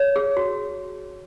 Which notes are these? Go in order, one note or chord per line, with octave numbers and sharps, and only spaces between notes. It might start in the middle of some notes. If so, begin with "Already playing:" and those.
Already playing: C#5
G#4
F#4